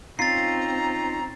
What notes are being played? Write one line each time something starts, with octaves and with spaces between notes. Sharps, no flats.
C4 C#4 D#4 F4 A#5 A6 C7